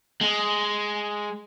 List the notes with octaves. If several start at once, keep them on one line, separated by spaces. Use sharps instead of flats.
G#3